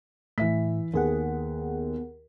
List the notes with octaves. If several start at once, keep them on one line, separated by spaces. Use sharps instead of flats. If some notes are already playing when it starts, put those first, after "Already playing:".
A2 E3 E5 B6
D#2 B3 G#4 F#5